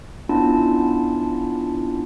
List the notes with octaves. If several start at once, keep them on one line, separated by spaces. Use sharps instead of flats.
B3 C#4 D4 E4 F4 A5